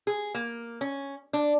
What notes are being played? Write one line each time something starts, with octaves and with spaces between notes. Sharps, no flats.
G#4
A#3
C#4
D4